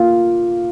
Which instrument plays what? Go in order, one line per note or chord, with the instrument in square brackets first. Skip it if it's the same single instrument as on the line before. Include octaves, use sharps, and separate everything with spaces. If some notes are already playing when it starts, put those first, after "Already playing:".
Already playing: [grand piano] A#3 F4